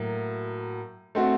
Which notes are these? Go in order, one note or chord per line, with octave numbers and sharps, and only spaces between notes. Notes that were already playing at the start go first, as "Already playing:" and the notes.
Already playing: A2 F#3 A#3
A3 C4 F#4